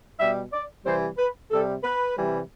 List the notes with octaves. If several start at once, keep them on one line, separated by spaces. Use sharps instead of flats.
B2 G3 E5
D5
C3 E3 G3 C5
B4
C3 G3 A4
B4
C3 E3 G3